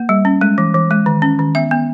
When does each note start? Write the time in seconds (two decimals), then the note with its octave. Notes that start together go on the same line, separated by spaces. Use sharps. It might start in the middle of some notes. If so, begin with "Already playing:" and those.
Already playing: A#3
0.09 G3
0.25 C#4
0.41 G#3
0.58 E3
0.74 E3
0.91 G#3
1.06 D#3
1.22 C#4
1.39 D#3
1.55 B3 E5
1.71 B3